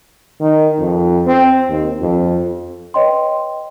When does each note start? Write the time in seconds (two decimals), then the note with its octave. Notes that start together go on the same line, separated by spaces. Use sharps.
0.40 D#3
0.79 F2
1.27 C4
1.69 D#2
2.01 F2
2.94 B4 C#5 D#5 G5 C6